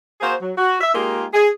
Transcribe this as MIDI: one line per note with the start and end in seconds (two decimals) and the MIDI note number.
0.21 0.34 58
0.21 0.34 66
0.21 0.34 68
0.21 0.34 72
0.41 0.51 54
0.58 0.77 66
0.81 0.91 76
0.94 1.25 56
0.94 1.25 58
0.94 1.25 63
0.94 1.25 65
0.94 1.25 67
0.94 1.25 68
1.34 1.49 68